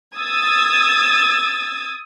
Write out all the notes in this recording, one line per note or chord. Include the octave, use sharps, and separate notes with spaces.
D#6 E6 G#6 A6